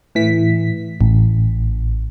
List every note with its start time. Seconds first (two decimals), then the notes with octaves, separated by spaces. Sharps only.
0.15 A2 E3 B6
1.01 A1